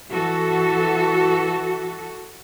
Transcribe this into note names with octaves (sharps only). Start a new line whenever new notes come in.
E3 F#4 A4